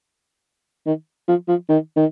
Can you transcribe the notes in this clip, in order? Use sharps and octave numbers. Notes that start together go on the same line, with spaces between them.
D#3
F3
F3
D#3
D#3